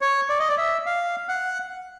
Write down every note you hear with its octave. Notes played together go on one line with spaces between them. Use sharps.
C#5
D5
D#5
D5
E5
F5
F#5